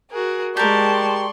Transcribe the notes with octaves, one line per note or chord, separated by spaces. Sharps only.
F#4 G#4 A#4
G#3 G4 A#4 D5 A5 C6 C#6